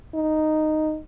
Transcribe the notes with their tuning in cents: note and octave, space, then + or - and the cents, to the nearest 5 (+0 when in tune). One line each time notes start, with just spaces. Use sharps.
D#4 -5